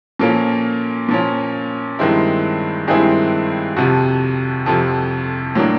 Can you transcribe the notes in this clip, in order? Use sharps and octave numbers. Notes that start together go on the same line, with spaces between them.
A#2 F3 A#3 C#4 A4
A#2 F3 A#3 C#4
G2 D#3 G#3 C4 E4
G2 D#3 G#3 C4 E4 G#4
F2 C3 F3 F#4
F2 C3 F3 A4
A2 F#3 A#3 D4